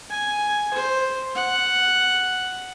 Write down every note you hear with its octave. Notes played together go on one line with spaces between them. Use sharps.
G#5
C5
F#5